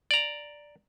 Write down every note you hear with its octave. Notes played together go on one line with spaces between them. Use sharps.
D5 A#5